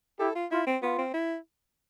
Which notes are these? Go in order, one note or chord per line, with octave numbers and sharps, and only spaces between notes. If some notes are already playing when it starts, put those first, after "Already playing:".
E4 G4 A4
F4
E4 F4
C4
B3 F4
C4
E4